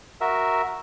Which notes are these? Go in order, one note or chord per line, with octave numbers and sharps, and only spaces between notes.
F#4 A#4 E5